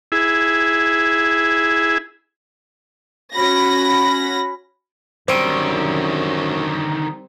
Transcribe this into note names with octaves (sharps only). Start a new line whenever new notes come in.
E4 G#4
C#4 F#4 B5 A#6
F#2 D3 D#3 G3 C4 C5 D7 D#7